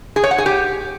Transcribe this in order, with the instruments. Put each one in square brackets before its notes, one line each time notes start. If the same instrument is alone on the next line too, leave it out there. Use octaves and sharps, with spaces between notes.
[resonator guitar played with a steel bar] G#4
C#5
F#5
G#4
G4